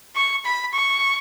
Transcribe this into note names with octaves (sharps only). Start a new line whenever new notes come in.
C#6
B5
C#6